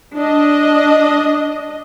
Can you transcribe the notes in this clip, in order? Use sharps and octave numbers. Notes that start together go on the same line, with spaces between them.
D4 D#5